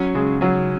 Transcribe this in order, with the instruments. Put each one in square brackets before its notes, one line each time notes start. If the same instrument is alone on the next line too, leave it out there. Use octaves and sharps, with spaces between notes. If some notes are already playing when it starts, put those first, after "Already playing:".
Already playing: [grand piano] F#3 [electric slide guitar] C#4
[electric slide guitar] C#3 [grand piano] G#3
[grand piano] F#3 [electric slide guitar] C#4